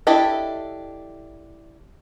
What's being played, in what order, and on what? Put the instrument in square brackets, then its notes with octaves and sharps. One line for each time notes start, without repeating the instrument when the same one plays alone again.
[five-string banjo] D4 E4 G4 A4 D#5